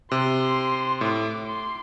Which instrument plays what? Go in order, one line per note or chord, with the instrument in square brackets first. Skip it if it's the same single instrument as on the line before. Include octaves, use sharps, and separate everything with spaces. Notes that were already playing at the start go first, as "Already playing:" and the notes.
[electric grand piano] C3 [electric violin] C6
[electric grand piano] A2 [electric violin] D6
[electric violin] C6